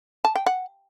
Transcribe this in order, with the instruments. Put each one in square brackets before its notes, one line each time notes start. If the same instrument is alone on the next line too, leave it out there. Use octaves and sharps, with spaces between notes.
[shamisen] A5
G5
F#5